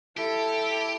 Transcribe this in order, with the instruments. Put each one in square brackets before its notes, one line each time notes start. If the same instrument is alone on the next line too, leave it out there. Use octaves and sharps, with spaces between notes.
[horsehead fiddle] E4 A4 [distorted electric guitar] G4